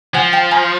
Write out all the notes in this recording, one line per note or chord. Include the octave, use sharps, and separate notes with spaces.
F3 F#5 G#5
G5 A5
G#5 A#5